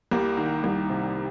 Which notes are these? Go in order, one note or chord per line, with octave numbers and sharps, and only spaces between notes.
C2 G3 A#3
D#3
C2
C3